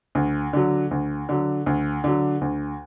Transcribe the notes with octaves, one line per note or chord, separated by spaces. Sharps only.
D2
D3 F#3
D2
D3 F#3
D2
D3 F#3
D2